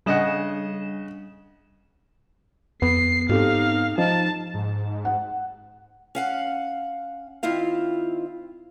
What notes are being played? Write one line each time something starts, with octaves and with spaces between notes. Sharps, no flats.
C#3 G3 D4 D#5 F#5 E7
F2 B3 C7
G#2 C4 D#4 G4 A4 F5
F3 D#4 A5
G#2
F#5
C#4 F5 F#5
D#3 C4 E4 F4 F5